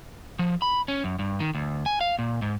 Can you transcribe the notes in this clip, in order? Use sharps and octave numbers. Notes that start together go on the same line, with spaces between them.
F3
B5
C#4
F#2
G2
D#3
D2
G#5
F5
A#2
G#2